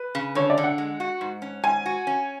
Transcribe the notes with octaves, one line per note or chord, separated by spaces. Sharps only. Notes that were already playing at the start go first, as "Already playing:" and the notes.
Already playing: B4
C#3
D3 C#5
D5
D3
F#5
G#3
F#4
G#2
C#4
G#2 G#5
F#4
C#4